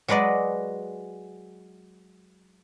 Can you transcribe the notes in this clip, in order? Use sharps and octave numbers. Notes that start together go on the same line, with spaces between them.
F#3 G#3 B4 D5 D#5